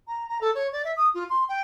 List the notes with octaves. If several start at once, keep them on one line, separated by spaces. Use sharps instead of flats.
A#5
A#5
A4
C#5
D5
E5
D#6
F4
C6
G5